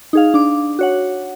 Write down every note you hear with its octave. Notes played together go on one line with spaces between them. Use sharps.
D#4 G#4 F5
D4 D6
F#4 C#5 F#5